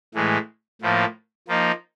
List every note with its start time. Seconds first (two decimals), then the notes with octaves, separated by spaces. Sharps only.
0.15 A2 E3 G#3
0.82 A2 F3 A#3
1.48 F3 A#3 D#4